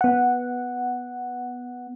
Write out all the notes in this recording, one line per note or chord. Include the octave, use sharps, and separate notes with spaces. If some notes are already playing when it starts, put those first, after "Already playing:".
B3 F#5